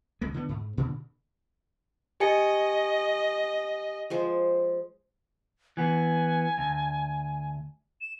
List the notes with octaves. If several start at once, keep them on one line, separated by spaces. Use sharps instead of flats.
D#1 C#2 G#3
D3 B3
G#2
A#2 D3
G4 D#5 G#5 C#7
F3 G#3 C5
E3 B3 G#5
D2
E7